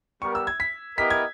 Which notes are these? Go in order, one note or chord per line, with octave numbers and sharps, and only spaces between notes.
G3 B3 G4 A#4 C#6
E6
G#6
B6
B3 E4 G4 A#4 D#5 B6
G#6